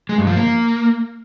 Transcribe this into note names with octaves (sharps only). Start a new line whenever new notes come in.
G#3
G2
F3
A#3